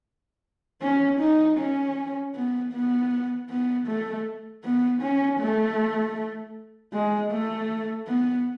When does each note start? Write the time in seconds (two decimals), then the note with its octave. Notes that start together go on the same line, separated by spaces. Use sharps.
0.82 C#4
1.20 D#4
1.58 C#4
2.35 B3
2.73 B3
3.50 B3
3.88 A3
4.64 B3
5.02 C#4
5.40 A3
6.93 G#3
7.31 A3
8.07 B3